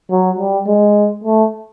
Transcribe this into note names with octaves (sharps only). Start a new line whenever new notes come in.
F#3
G3
G#3
A3